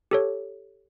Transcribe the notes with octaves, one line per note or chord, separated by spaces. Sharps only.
G4 A4 C#5